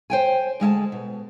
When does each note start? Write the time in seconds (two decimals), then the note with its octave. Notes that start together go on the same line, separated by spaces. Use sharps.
0.10 C5 G5 G#5
0.60 D2 G#3 E5 A5
0.92 B2